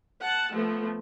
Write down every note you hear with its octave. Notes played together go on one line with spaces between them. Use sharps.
F#5 A5
F3 A3 B3